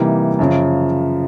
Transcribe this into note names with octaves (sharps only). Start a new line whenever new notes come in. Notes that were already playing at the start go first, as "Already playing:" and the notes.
Already playing: C3 E3 G3 A#3 D#4
F#2 C#3 F3